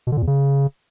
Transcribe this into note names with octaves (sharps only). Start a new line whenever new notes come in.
B2
D3
A#2
E2
C#3